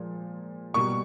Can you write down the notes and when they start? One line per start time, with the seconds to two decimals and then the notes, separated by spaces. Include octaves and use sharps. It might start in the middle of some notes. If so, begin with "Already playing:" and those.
Already playing: A#2 F3 G#3
0.74 B2 G3 A#3 C#6